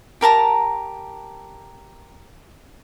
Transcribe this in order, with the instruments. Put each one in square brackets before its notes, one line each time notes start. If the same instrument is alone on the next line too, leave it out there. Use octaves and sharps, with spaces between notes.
[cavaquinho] G4 A#4 A5 A#5